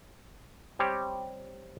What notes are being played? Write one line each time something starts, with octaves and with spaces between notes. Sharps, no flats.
G3 C4 G4 C#5